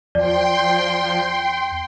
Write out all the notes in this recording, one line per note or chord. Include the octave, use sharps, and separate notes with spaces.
E2 F3 D5 G5 C6